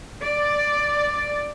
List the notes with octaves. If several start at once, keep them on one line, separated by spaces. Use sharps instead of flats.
D5